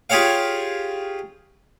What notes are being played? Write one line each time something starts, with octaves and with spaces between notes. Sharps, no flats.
F4 G4 G#4 C#5 F5